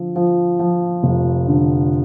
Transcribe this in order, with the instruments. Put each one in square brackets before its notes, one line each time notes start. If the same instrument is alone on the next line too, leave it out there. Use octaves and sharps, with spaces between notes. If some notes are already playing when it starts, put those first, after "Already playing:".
Already playing: [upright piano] D3 F3
F3
F3
F1
D3